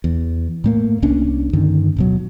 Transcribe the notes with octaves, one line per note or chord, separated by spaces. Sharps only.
E2
A2 A3 A#3
C2 A#3 C#4 D4
G2 D3 D#3
D1 B2 F#3